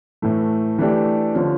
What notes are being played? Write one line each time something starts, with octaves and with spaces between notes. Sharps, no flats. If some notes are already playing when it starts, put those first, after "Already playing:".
A2 E3 A3
E3 A3 D4 G4
D3 F3 C#4